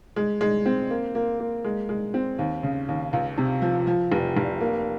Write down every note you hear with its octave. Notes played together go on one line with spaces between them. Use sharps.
G#3
G#3
C4
A#3
A#3
A#3
G#3
G#3
C4
D#2
C#3
D#2
C#2
C3
F3
F3
F1
F1
A#3